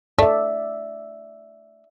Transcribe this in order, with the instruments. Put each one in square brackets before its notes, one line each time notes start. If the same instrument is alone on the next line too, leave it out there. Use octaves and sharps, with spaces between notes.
[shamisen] A3 [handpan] D5 E5